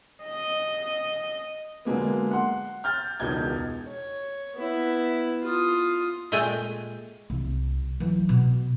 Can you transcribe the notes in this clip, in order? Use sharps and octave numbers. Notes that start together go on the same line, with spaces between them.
D#5
D3 F#3 G#3 A#3 B3
F#5 C6
F6 G6 A6
E1 C#2 B2 D#4 G6 G#6
C#5
B3 E4
F4 D#6
A#2 G#3 A3 G5 G#5
C2
E3 F#3
B2